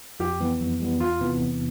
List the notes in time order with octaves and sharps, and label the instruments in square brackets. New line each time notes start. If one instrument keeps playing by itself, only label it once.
[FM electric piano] F2 [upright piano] G4
[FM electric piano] E3 G3 B3
F2
E3 G3 B3
[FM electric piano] E2 [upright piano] F4
[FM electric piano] C3 E3 B3
E2